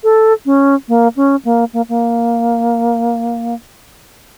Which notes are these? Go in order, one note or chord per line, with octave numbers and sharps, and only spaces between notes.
A4
C#4
A#3
C#4
A#3
A#3
A#3